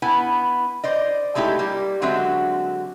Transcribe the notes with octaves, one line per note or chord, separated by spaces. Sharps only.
B3 E4 G#5
C5 D5 D#5
G#3 A3 D#4 E4 G4
G3 A#3
D3 F#3 G#3 C4 F#4 E5